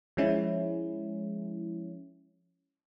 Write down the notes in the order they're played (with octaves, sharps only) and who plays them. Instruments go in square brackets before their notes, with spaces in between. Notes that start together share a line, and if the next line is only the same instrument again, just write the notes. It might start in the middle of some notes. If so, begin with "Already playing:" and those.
[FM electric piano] F3 G#3 C#4 E4